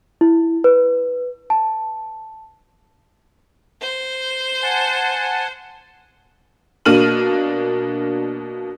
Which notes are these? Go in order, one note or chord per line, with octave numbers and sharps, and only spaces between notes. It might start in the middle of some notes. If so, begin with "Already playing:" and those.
E4
B4
A5
C5
F#5 G#5 A5
B2 A#3 D4 F6 D#7 F#7